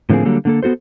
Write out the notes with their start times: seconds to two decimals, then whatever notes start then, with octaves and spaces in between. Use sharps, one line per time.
0.10 A2 D3 F3 A#3 C4 G#4
0.25 D3 F#3 G3 A#3 A4
0.45 D3 A#3 A4
0.63 B3 F#4 A4 C5